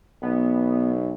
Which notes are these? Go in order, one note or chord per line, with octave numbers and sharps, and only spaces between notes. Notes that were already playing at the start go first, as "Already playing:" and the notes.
B1 B3